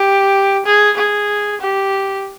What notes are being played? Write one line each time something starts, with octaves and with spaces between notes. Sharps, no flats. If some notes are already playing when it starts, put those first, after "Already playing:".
Already playing: G4
G#4
G#4
G4